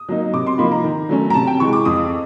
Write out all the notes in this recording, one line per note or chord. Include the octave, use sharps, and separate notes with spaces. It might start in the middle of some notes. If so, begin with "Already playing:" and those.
Already playing: D#6
F#3 A#3 D#4
C3 D6
C6
F3 A#3 D#4 B5
A#5
D#3
F#3 A3 C#4
A#5
C3 A5
G5
E3 G#3 C#6
D6
F2 D#6